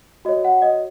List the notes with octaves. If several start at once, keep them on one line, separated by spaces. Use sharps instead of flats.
F#4 C#5 D#5
F#5
D#5